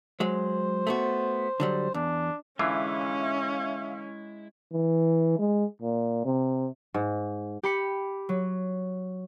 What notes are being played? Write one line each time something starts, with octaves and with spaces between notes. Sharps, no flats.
F#3 G#3 C5
A3 B3 F#4
D3 F#3 G3
E2 D4
D3 E3 G#3 C#4 E4 F4 E5 F5
E3
G#3
A#2
C3
G#2
G4 B5 C#7
F#3